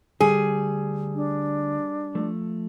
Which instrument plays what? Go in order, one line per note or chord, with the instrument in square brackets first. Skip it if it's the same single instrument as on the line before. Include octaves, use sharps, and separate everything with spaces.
[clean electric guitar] D2 D3 [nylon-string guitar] G3 [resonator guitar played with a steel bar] G#4
[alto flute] D4
[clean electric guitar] F3 A3